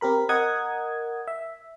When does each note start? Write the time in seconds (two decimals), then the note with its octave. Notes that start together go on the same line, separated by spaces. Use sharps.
0.01 C4 G4 A#4 B5
0.29 A#4 D#5 F#5 D#6 G#6
1.27 E5